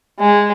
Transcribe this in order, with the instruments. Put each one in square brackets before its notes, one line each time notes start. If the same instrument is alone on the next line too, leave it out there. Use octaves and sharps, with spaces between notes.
[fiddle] G#3